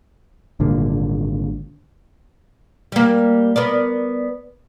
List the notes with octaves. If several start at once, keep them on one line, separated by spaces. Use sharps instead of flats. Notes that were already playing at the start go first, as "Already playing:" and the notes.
G#1 A#2 D3 A#3
G3 A#3
B3 A#4 D5